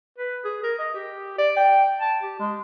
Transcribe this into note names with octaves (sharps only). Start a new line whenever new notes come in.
B4
G#4
A#4
D#5
G4
D5
G5
A5
G4
G#3